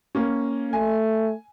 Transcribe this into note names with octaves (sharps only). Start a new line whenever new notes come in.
A#3 C#4
A3 G#5